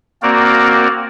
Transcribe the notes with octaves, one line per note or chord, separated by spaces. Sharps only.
A#3 C4 F#4 A#4 D5